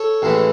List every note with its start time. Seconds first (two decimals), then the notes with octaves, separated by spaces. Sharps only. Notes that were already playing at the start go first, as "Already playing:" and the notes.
Already playing: A4 C#5
0.22 A1 A2 E3 G#3